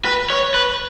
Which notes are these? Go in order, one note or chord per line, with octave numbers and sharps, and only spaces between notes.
B4
C#5
B4